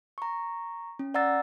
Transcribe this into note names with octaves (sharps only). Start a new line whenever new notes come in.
A#5 C#6
C#4
D5 F#5 A#5 E6 A6